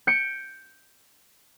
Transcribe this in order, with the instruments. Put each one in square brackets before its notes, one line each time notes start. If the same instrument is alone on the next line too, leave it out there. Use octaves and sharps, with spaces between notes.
[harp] G6 C#7 D7